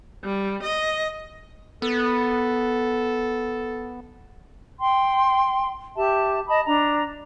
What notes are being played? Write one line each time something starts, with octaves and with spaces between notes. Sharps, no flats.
G3
D#5
B3 A4
G5 C6
G4 E5 A5
D#5 A5 B5 D#6
D4 A#5